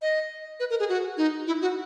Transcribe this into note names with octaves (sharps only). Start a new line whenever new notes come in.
D#5
B4
A#4
G#4
F#4
D#4
E4
F#4